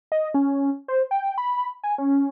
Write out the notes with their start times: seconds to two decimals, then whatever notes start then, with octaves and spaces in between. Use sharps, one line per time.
0.12 D#5
0.34 C#4
0.88 C5
1.11 G5
1.38 B5
1.84 G#5
1.98 C#4